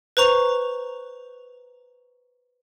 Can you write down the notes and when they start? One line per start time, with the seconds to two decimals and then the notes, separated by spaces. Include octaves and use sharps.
0.17 B4 C5 A#5 C#6 F7